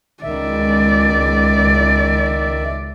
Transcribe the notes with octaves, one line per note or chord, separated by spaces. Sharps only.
C#2 D#3 D5 E5